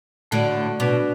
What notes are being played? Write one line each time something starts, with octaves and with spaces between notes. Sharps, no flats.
A2 D3 A3 F#4 D5 F#5
B2 D4 F#4 B4 D5